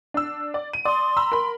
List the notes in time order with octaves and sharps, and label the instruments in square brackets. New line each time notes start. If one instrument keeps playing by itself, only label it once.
[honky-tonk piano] D4 E6
D5
D#7
[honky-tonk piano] D5 D#6 [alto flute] C6
[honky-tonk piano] A#5 B5 E6
A#4 B5